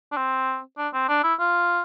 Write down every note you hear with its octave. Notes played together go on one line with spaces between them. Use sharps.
D4
C4
D4
C4
D4
E4
F4